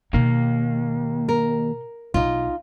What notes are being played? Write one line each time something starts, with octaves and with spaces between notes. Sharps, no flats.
D#2 B2 A#3 D#4
A#4
B1 D#4 F4